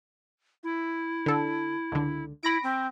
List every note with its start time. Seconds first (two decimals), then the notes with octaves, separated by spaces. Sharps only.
0.64 E4
1.26 D3 A4
1.92 C#2 D3
2.43 E4 B5 A#6 D7
2.63 C4